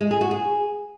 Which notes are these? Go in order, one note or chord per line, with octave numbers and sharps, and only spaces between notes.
G#3
G#4
F#4
G#4